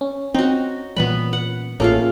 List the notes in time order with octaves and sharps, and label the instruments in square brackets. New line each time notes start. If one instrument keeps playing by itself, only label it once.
[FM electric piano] C#4
[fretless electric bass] C4 [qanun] D#4 F#4
[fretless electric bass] A#2 E3 G3 [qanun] B3 B4 B5
[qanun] F#5
[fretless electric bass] A1 A2 [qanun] A#3 F4 F5 [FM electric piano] C#4 G#4 A4